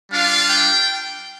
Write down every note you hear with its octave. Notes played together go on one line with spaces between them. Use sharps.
G3 D4 F4 F5
G5